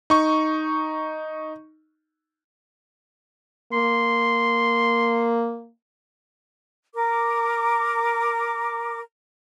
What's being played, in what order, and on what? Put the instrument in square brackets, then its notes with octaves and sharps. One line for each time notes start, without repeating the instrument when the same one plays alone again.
[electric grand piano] D#4 C#6
[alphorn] A#3 [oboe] C6
[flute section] A#4 D6